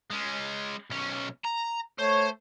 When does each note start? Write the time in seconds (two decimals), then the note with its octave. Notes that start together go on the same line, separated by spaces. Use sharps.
0.11 G#3 C#4
0.90 B1 C#4
1.44 A#5
1.99 A3 C5 C#5